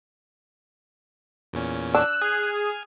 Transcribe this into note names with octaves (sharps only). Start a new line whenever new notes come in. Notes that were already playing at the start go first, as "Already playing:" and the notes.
E2 A#2 C#4
D4 E6 F#6
G#4 G#5 F6